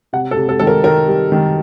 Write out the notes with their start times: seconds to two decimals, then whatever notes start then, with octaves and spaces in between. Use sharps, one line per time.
0.13 C3 F#5
0.31 A4
0.37 C3
0.49 A4
0.60 D#3 A4
0.67 A#4
0.84 D#3 A#4
1.08 G3
1.32 D#3